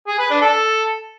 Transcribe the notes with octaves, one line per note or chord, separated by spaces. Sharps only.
G#4
B4
D4
A4